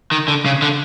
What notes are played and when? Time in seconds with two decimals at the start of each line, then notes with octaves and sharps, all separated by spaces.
0.11 D#3
0.28 D3
0.46 C#3
0.62 D3